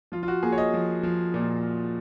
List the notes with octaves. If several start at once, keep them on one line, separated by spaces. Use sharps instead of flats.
F3 F4
F4
F#4
A#3 G#4
C#5
D#5
F3
F3
A#2